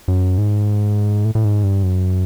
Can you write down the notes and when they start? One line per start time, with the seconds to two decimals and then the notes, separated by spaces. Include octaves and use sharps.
0.08 F#2
0.38 G#2
1.25 A2
1.35 A2
1.45 G#2
1.63 G2
1.83 F#2